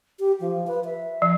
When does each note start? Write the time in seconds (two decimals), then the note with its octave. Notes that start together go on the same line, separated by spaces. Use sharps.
0.20 G4
0.40 F3
0.67 B4
0.85 E5
1.22 F3